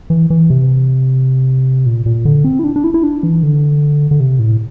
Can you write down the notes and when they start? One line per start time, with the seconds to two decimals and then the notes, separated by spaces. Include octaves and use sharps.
0.10 E3
0.30 E3
0.50 C3
1.86 A#2
2.06 A#2
2.25 D3
2.45 C4
2.59 E4
2.64 D4
2.76 D4
2.84 E4
2.94 E4
3.03 D4
3.23 E3
3.43 D3
4.11 D3
4.20 C3
4.39 A2